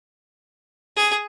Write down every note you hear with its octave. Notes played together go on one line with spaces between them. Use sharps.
G#4